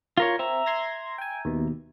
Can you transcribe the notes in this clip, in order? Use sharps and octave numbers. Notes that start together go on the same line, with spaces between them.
F4 A#4 C#5
C4 E5 A#5
C6 G#6 A#6
G5 G#5
D#2 B2